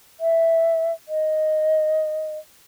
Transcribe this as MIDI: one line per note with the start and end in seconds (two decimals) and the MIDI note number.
0.20 0.92 76
1.08 2.38 75